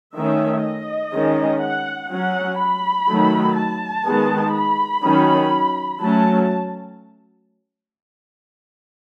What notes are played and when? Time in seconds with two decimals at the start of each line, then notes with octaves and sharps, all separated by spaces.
0.15 D#3 A3 C#4 E5
0.64 D#5
1.13 D#3 G#3 C#4
1.62 F#5
2.11 F#3 C#4 F#5
2.60 B5
3.09 D#3 F#3 A3
3.58 A5
4.06 D#3 G#3 B3
4.55 B5
5.03 D#3 F#3 C#4
6.01 F#3 A3 C#4 A5